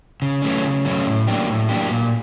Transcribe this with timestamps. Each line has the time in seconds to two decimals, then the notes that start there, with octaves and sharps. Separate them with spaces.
0.22 C#3
0.42 F#3 A3 C#4
0.64 C#3
0.85 F#3 A3 C#4
1.05 A2
1.27 F#3 A#3 D4 G4
1.48 A2
1.69 F#3 A#3 D4 G4
1.90 A#2